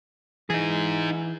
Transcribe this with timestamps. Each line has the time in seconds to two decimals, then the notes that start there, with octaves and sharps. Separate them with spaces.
0.50 E3 D#4 G#4